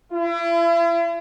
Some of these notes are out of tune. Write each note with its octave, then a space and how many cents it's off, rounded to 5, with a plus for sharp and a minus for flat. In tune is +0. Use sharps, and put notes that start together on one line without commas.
E4 +40